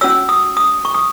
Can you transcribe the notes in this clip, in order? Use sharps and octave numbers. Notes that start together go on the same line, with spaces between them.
C#4 F#4 C#5 E6
D#6
D#6
C#6
D#6